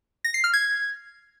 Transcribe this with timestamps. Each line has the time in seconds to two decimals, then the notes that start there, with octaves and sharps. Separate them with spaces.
0.24 A#6
0.34 C7
0.44 F6
0.53 G#6